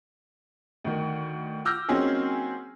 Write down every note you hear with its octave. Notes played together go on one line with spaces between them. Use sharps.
D2 D#3
D6 E6 F6 G6 A#6
F#3 A#3 C4 C#4 D#4 G#4